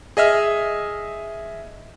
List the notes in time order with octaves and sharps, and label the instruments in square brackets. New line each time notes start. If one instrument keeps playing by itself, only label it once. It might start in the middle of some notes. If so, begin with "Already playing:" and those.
[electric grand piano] G#4 D#5 E5 F6